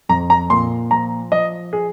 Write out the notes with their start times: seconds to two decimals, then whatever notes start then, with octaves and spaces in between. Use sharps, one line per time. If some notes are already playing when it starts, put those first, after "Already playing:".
0.09 F2 A#5
0.30 A#5
0.50 A#2 C6
0.91 F3 A#5
1.32 F3 D#5
1.73 G#4